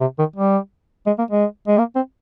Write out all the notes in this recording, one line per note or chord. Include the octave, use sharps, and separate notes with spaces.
C3
D#3
G3
G#3
A#3
G#3
G#3
A#3
C4